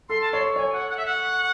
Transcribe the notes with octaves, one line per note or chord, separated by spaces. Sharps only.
A4 C6
A5
C#5 C6
C#5 G#5
F#5
F#5
E5
F#5